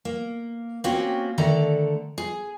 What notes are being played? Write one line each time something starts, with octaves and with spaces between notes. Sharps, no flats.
A#3
A#3 C4 C#4 F#4 G4
D3 D#3 A3 A4 D5 A#5
G#4